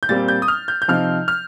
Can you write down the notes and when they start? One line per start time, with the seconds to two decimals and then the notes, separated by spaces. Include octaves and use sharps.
0.03 G6
0.09 A#2 G3 C4 A6
0.28 G6
0.42 D#6
0.48 F6
0.68 G6
0.82 G6
0.88 C3 F3 C4 D#4 F6
1.28 F6